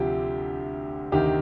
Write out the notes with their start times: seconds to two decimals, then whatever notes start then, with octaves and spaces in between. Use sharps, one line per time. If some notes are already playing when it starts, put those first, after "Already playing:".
Already playing: D2 C3 F3 G4
1.12 D2 C3 D#3 G4